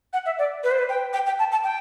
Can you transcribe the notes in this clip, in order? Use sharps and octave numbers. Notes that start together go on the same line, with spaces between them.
F#5
E5
D5
B4
C5
B4
G5
G5
G5
A5
A5
G5